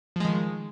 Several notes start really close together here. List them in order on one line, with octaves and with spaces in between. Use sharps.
F3 G#3 D#3